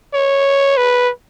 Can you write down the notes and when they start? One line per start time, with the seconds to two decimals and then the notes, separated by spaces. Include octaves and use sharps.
0.14 C#5
0.77 B4